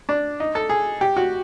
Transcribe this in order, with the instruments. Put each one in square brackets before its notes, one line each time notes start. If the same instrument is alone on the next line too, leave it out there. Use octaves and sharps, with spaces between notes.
[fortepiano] D4
D#4
A4
G#4
G4
F#4